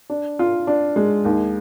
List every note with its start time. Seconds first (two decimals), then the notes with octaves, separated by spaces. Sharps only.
0.10 D4
0.39 F4
0.67 D4
0.96 G#3
1.25 D#2